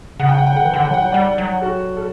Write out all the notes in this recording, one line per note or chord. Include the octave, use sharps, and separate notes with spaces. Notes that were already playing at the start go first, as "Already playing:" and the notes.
C#3 F#5
G5
F#5
G5
D3 F#5
E3 G5
D3 F#5
G5
F#3 F#5
G5
G3 D5 F#5
F#3
F#4 A4
A4